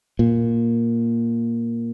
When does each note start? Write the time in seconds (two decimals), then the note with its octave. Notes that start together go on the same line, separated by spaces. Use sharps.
0.19 A#2